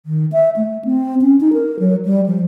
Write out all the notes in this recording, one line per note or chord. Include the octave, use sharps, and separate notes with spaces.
D#3
E5
A3
C4
C#4
D#4
A#4
F#3
G3
F3